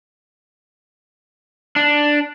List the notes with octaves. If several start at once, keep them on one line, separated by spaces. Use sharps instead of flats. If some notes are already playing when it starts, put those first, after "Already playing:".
D4